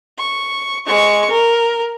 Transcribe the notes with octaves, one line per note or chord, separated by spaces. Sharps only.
C#6
G#3 C#6
A#4